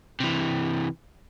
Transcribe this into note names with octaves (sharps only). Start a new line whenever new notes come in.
C3 E3